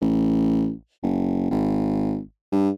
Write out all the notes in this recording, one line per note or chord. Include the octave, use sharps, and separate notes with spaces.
A1
F#1
G#1
G2